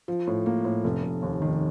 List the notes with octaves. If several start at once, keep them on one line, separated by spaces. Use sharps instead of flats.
F3
A2
A#3
A2
F1
F1
D#2
D#3